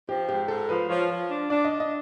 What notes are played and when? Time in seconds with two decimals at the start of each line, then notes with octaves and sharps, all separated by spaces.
0.09 F3 G4
0.29 G#2 G4
0.48 G#2 A4
0.69 F3 B4
0.89 F3 C#5
1.10 F3
1.30 D4
1.50 D4 D5
1.65 D#5
1.70 D4
1.80 D#5